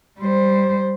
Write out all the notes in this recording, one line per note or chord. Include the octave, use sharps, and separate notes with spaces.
G3 C5